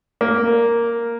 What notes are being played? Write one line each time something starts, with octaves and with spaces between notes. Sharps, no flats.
A#3